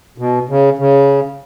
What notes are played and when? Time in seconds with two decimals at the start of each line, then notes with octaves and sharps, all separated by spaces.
0.18 B2
0.49 C#3
0.78 C#3